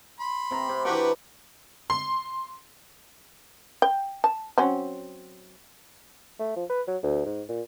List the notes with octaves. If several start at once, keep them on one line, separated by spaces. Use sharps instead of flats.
B5 C6
C3 A#5
C3
E3 D4 F#4 G4 B4
C6
G5
A5
F#3 C4 C#4
A3
F3
B4
F#3
D2
G#2
A#2